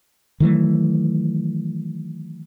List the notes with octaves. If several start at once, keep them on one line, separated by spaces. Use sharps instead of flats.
D#3 E3 F#3 A3